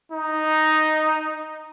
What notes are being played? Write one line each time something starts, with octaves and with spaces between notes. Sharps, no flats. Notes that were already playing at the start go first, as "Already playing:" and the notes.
D#4